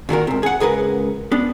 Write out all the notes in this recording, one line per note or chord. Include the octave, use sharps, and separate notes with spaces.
A#2 D#3 F#4 A#4
G#2 C3
G#4 F#5
C#2 G#4 A#4 B4
B3 D4